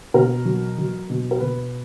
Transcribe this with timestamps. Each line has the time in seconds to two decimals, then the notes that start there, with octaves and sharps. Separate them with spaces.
0.14 B2 A#4
0.45 F#3
0.78 F#3
1.10 B2
1.31 A#4
1.40 B2 B4